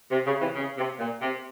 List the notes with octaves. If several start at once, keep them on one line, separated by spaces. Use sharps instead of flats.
C3
C#3
C3 E3
C#3
C3
A#2
C3